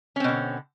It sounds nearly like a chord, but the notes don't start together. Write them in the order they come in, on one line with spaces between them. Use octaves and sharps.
C#4 C4 B2 D3